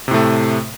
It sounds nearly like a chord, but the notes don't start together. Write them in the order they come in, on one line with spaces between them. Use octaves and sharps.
C3 A2 A3